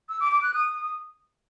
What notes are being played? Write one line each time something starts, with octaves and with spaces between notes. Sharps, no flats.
E6
D6
D6
F#6
D#6